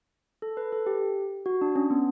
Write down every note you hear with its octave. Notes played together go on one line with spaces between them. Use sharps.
A4
B4
A4
G4
F#4
D4
C#4
B3